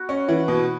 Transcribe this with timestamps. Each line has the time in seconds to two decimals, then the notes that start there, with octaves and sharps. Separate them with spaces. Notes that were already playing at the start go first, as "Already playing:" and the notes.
Already playing: B3 F#4
0.09 C#4
0.28 E3
0.48 B2